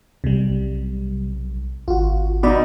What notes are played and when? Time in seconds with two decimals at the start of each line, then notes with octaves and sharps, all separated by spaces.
0.24 B1 C3 G3
1.88 G#1 F4 F#4
2.43 B2 D#4 F#4 D5 B5